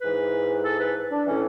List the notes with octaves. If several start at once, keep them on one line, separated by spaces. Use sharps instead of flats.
G#2 E3 B4
A4
B4
D4
A2 E3 C#4